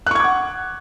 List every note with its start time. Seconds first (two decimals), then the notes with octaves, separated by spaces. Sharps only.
0.06 F#6
0.11 C#6
0.15 G#6
0.20 D6
0.24 F#5